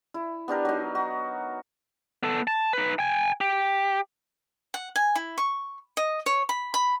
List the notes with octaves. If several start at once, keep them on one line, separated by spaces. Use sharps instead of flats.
E4
B3 D4 G4 A#4
F#3 D#4
F#4
B3 A4
A5
D#4 B4
G5 G#5
G4
F#5
G#5
E4
C#6
D#5
C#5
B5
B5